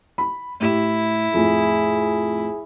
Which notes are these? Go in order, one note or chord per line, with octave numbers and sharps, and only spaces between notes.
B5
A2 E4 G4 E7
F2 A2 G#4